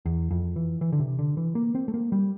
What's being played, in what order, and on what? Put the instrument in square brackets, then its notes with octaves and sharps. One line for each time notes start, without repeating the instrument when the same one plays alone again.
[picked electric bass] E2
F2
E3
E3
D3
C3
D3
E3
A#3
C4
A3
A#3
G3